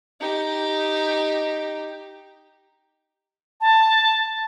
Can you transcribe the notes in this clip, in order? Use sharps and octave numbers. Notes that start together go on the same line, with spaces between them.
D#4 G4
A5